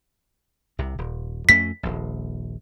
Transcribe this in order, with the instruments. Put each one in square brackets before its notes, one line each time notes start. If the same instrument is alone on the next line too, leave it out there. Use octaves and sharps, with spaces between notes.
[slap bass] C2 C3
D#1
[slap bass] F2 A3 C#4 [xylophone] B6
[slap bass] D#1 A#1